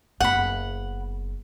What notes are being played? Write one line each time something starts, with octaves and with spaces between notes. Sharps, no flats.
F#1 B3 F#5 B5